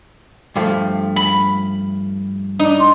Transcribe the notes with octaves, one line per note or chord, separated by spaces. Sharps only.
G2 F3 A3
B5
D4 D#4
C6